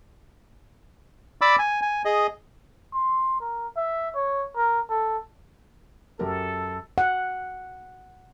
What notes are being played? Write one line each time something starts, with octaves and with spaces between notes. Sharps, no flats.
D5 B5 D6 E6
G#5
G#5
G#4 D#5
C6
A#4
E5
C#5
A#4
A4
F#2 G4 A4 A#4
F#5